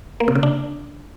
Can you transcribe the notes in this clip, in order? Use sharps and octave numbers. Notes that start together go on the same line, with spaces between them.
A#3
C3
C#3
D4